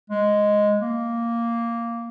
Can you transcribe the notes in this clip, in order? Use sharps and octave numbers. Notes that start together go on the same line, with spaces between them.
G#3
A#3